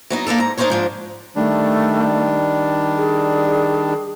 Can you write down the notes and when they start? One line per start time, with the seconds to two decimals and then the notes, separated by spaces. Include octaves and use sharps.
0.10 F#3 B3 D#4
0.27 A#3 B3 D4 A4
0.38 G#2 A#5
0.57 D4 D#4 F#4 A#4 C5 C#5
0.70 G#2 F3 D4
1.36 D#3 G3 A3 D4
2.96 G#4